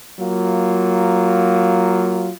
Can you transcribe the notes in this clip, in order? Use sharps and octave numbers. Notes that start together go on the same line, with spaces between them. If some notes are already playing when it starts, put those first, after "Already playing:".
F#3 A#3 F4